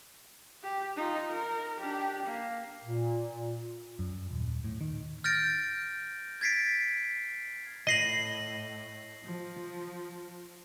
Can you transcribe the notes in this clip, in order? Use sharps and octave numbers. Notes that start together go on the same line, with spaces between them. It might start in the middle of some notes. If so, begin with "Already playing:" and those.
G4
D#4 F4
A#4
D4 G4
A#3
A#2
F#2
D#1
A2
D#3
F6 G6 A6 A#6 D7
G#6 A6 B6 C7 D7
A2 D#5 A#6 C7 F#7
F3